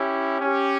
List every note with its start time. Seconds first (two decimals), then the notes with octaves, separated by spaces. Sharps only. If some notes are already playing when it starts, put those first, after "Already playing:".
Already playing: C#4 E4 G4
0.41 C#4 G4